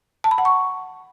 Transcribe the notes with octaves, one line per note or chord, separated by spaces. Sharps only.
A5
B5
F#5
C#6